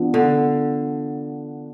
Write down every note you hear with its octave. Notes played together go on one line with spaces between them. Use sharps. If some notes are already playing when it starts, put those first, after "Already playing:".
Already playing: E3 B3 D4 F4
D3